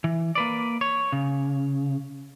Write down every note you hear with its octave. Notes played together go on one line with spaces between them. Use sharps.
E3
A#3 B4 D5
C#5
C#3